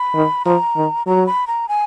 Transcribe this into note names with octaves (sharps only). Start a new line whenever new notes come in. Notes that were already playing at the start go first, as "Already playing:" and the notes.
Already playing: B5
D#3
F3 A#5
D#3
F#3 A#5
B5
A#5
G#5